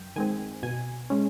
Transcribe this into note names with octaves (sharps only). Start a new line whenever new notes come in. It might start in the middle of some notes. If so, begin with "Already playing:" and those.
Already playing: F#2 G5
D#3 G#3 C4 G#5
B2 G#5
G#3 C#4